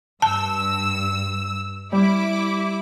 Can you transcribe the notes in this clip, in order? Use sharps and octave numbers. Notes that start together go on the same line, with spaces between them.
G2 A5 E6
G3 E4 D6